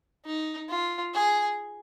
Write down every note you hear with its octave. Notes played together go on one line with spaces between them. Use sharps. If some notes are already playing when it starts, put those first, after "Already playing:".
D#4
F4
G#4